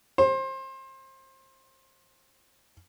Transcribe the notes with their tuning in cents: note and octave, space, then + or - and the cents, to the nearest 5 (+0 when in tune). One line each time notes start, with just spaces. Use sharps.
C5 +25